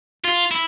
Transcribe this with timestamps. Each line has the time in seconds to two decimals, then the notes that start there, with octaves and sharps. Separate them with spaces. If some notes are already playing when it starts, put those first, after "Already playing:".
0.25 F4
0.51 E4